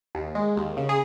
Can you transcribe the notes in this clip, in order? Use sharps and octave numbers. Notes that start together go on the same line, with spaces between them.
D#2
G#3
D#2
C#3
G#4